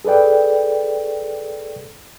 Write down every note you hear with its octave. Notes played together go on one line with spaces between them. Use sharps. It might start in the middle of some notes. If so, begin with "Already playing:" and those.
G#4 A4 B4 D5 G5